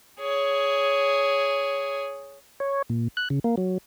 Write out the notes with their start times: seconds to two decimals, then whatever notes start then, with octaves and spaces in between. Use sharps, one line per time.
0.20 G#4 C#5
2.60 C#5
2.90 A#2
3.17 F#6
3.30 C#3
3.44 A#3
3.57 F#3